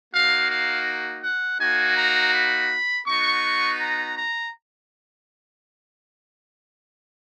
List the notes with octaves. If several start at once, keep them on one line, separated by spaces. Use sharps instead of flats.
A#3 D#4 F#4 F5
F5
F#5
A#3 D#4 F#4 G#5
A#5
B5
B3 D#4 F#4 C#6
A#5
A#5